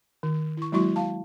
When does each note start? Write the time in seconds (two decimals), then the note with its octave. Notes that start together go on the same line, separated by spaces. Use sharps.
0.23 D#3
0.57 E4 C#6
0.72 F#3 G#3 A#3 E4 F#4 C#6
0.96 F5 A5